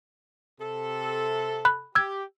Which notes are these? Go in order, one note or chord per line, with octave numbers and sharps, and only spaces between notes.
C3 A4
B5 F#6
G4 E6 G#6